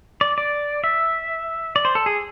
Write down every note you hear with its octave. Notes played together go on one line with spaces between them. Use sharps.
D5
D5
E5
D5
C5
A4
G#4